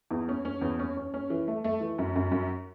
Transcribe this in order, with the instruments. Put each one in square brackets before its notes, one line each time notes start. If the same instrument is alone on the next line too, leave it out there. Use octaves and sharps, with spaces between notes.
[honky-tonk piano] E2
C#4
C#4
E2
C#4
C#4
C#4
E3
A3
A3
E3
F#2
F#2
F#2